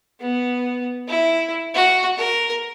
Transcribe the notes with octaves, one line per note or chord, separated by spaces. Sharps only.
B3
E4
F#4
A#4